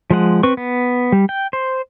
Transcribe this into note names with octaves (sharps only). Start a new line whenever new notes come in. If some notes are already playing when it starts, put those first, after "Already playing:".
F3 G#3 F#5
C4 B4 C#6
B3
G3
G5
C5